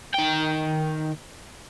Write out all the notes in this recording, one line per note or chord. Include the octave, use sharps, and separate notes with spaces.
D#3 G5